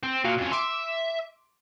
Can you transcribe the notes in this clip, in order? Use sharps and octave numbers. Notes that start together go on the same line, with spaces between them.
C4
A#2 F#4 F5
F2 C#4
E5 C6 D6 D7